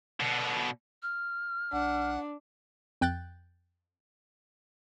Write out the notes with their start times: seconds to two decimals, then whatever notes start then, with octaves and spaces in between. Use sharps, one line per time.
0.20 B2 D3
1.03 F6
1.73 B1 D4 F#5
3.01 F2 G5 F#6 G6 A6